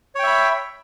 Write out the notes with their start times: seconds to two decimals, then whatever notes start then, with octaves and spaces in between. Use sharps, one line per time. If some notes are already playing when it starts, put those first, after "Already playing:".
0.15 C#5
0.19 G5
0.23 E5
0.27 B5